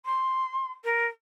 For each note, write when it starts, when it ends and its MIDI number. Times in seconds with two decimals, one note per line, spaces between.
0.05 0.70 84
0.84 1.05 70